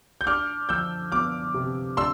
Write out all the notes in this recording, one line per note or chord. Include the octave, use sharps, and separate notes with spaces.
G6
D4 D6 F6
F3 E6 G6
B3 D6 F6
C3
D4 C6 E6